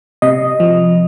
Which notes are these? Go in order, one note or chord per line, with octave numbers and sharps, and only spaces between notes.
C3 D#5
F3